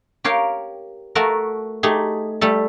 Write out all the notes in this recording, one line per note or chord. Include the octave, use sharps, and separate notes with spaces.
G4 A#4 C#5 F5 G5
A3 F#4 A4 A#4
A3 D#4 G4 G#4
G3 A3 A4